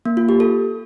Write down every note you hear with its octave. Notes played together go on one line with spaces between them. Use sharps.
A#3
F4
G4
A4